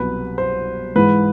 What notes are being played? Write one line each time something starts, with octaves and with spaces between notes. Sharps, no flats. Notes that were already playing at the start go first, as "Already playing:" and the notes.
Already playing: C2 B2 F#3 B4
C5
G#2 E3 G#3 B4